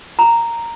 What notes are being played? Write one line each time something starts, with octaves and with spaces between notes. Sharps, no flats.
A#5